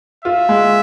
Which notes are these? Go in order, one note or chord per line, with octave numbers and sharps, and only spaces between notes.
F4 E5
G#3